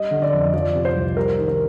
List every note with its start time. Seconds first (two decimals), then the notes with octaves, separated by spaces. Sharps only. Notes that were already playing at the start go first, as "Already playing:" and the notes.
Already playing: G3 D#5
0.11 D3
0.22 D5
0.33 F2
0.54 F3 D5
0.75 C3
0.85 C5
0.95 C2
1.17 G3 A#4
1.38 D#3
1.48 A#4